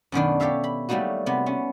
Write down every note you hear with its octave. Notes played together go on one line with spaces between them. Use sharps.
F#2 B2 D#3 D4
G4 A4 C#5 E5 F5
B5
F#3 G3 A3 A#3 D#4 F#4
C3 B3
B3 C#4